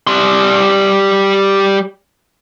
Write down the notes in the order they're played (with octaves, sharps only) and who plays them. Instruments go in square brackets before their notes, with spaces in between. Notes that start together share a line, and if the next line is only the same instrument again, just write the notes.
[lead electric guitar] G3 C6